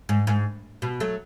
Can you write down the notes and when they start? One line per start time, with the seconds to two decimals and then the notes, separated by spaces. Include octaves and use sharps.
0.09 G#2
0.27 G#2
0.82 B2
1.00 F#3 A3